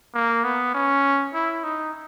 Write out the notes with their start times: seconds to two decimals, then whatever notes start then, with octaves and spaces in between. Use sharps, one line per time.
0.14 A#3
0.44 B3
0.74 C#4
1.34 E4
1.64 D#4